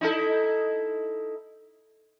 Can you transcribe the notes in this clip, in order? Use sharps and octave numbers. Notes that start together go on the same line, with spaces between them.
D#4 E4 A4